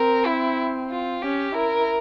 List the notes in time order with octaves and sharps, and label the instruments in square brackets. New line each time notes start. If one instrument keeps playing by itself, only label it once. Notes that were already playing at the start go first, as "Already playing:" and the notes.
Already playing: [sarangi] C4 [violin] A#4
[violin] E4
F4
[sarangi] C#4 [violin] G4
[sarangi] E4 [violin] A#4